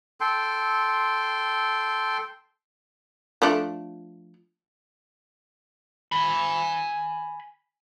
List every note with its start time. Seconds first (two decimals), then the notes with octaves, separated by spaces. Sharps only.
0.21 A4 G5 C6
3.42 F3 A3 D4
6.12 G#5 B5